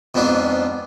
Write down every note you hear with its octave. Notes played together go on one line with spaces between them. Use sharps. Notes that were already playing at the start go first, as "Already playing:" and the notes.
F2 G#2 B3 D4 F4